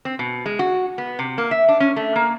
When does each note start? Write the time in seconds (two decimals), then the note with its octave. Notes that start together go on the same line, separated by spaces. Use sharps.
0.05 C4
0.19 B2
0.46 G#3
0.59 F#4
0.98 B3
1.19 C3
1.38 A#3
1.51 E5
1.68 D4
1.80 C#4
1.96 A3
2.16 A#3